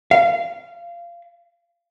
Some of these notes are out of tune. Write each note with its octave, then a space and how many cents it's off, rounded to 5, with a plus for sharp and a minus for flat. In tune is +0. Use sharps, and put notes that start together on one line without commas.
F5 -20